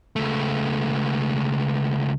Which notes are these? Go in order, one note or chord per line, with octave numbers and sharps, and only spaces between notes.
C#2 A3